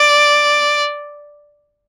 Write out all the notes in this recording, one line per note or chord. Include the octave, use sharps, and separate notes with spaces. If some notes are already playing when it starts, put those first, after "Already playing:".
Already playing: D5